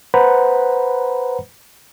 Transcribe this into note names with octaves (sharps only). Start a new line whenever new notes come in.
B4 C5 F#5 A#5 B5